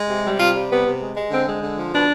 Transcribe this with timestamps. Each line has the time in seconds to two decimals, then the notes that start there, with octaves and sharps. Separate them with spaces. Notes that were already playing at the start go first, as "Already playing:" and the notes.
Already playing: G#3
0.09 C3
0.24 G3
0.39 C3 F4
0.55 G3
0.70 C3 B3
0.85 C3
1.01 G#3
1.16 G#3
1.31 D3 C4
1.47 G#3
1.62 D3
1.77 F3
1.93 B2 D4